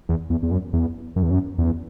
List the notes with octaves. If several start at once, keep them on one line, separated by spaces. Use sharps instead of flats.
E2
E2
E2
F#2
E2
F#2
E2
F#2
E2